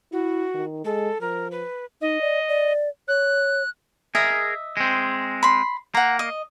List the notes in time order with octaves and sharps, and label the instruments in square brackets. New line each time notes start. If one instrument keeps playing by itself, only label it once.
[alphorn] E4 [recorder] F#4
[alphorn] D#3
[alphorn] G#3 [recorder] A4
[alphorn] F3 [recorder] A#4
[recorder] B4
[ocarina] D#4 [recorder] D#5
[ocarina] D5
D5
[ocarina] C#5 [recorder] F#6
[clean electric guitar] G#4 A#4 [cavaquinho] D#5 E5
[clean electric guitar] G#3 C4
[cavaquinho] B5 C6
[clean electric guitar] A#3 [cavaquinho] F#5 A#5
[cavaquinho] D#5